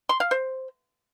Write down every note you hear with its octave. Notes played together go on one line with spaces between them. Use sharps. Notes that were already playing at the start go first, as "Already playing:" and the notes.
C6
F5
C5